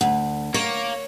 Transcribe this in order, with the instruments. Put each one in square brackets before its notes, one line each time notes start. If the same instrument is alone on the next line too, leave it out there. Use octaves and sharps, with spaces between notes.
[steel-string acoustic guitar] D2 [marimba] F#5
[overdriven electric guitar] A#3 [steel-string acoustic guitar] C#5